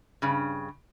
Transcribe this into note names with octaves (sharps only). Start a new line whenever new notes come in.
G2 C#3